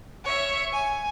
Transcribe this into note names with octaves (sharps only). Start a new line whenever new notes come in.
C#5 E5
G#5